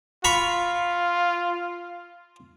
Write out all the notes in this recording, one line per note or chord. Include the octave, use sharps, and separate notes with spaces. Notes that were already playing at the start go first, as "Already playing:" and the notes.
F4 A#5 B5 C#6